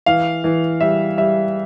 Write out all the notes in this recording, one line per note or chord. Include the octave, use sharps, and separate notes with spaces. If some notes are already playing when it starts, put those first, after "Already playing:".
E3 F5
E3
G3 E5
G3 E5